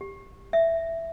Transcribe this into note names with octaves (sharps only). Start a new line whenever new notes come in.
G4
E5